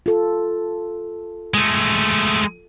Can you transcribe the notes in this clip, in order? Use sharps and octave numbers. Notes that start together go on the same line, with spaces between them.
F4 A4
G#3 A3